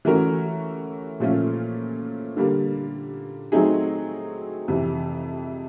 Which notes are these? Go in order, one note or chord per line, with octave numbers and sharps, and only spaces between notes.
E3 A3 C#4 F#4 A#4
A#2 F3 A3 C#4 F4
D3 G3 A#3
F#3 A3 C4 D#4 G#4
F2 C3 E3